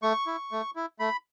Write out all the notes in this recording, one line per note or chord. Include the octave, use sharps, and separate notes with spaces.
A3 C#6
E4
A3
E4
A3 B5